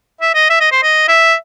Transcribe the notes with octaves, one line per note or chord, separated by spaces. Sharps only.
E5
D#5
E5
D#5
C5
D#5
E5